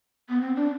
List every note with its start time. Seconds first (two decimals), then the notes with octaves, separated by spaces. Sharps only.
0.29 B3
0.41 C4
0.56 D4